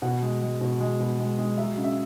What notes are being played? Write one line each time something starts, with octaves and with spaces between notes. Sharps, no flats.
B2 F#5
G#3
G#3
B2
G#3
B2
G#3
G#3
F#3 E5
C#3
E5